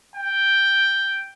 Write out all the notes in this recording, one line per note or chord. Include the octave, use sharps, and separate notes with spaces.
G5